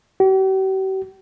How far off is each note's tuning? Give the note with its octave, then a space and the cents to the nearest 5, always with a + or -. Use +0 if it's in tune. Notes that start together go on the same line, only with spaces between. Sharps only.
G4 -45